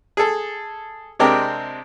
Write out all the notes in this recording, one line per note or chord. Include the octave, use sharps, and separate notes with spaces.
G#4 A4
C3 G#3 C4 D4 G4 A#4